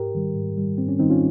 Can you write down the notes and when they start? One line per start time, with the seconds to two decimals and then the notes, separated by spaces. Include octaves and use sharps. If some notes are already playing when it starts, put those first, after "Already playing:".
Already playing: G#2 G4 A#4
0.15 D#3 G3
0.36 G#2
0.57 D#3 G3
0.78 G#2 C4
0.89 C#4
0.99 D#3 G3 C4 D#4
1.10 C#4 F4